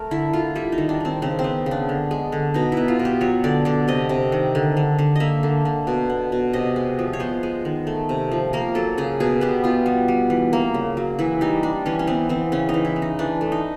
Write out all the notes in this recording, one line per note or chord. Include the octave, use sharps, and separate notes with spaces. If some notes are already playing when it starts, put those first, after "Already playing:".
Already playing: A3 A#4
D3 E4
D3 F4
G3 E4
D#4
D#3
D4
D#3 C4
C#3 C4
C4
B3
C#3 D4
D3
G#3
D3
B2 D#4
B3 E4
F4
B2
G4
F#3 C#5
D3 D5
D3 D5
C3 D#5
C3
D#3
D3
D3
D3
A#3 D#5 E5
D3
D3
B2
B3
B2
C3 D#5
G#3
F3
C#5
B3 C5
G#3
D#3
A3
C3
F3
A#3 A#4
F#3 A4
C#3 G#4
B2 G#4
B3 G4
B3 F4
G3
G3
E3
A#3
C#3
F#3
E3 E4
G3 D#4
G3 D4
E3 C#4
C#4
B3 C4
E3 C4
C#3 C#4
D#4
E3
E4
C#3
D#4
E3 D4
A3
D#4